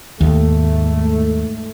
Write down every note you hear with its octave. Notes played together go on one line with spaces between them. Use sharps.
D#2 G#2 A3